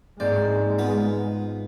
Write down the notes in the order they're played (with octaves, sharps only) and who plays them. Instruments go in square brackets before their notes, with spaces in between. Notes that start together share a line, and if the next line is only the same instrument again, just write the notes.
[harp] G#2 A#3 C4 [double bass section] G#3 [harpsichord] D5
[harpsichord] B3 B4 [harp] F4